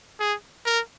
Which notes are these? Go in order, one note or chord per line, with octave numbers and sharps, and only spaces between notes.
G#4
A#4